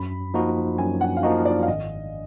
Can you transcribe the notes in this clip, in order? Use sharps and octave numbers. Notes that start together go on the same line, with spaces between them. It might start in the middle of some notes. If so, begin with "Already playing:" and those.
Already playing: F#2 B5
F3 A#3 D#4 F#4
F#2 G#5
F#5
F5
F3 A#3 D#4 F#4 D#5
D5
F5
G#1 D#5